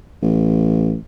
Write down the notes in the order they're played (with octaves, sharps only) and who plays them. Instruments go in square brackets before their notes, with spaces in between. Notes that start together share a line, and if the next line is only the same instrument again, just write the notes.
[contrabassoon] A1